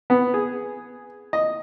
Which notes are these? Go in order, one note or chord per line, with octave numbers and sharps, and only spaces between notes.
B3
G#4
D#5